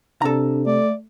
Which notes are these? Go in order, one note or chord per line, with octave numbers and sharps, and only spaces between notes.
C3 D4 A4 A#5
A3 D5